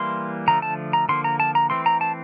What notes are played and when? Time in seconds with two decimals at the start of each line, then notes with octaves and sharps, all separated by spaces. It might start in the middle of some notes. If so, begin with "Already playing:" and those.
Already playing: E3 G3 A#3 C6
0.47 D3 F3 A3 A#5
0.62 A5
0.93 A#5
1.09 D3 F3 A#3 C6
1.24 A#5
1.40 A5
1.55 A#5
1.70 E3 A3 C4 C6
1.86 A#5
2.01 A5